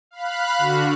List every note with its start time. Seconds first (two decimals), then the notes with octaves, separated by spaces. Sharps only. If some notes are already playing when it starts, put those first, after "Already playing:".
0.11 F5 B5 F#6
0.58 D3 F#4